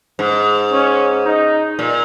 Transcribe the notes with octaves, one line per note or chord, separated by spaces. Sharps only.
G#2
C#4
D#4
A#2